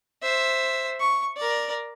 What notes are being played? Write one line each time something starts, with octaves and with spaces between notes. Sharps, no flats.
C5 E5
C#6
A#4 D5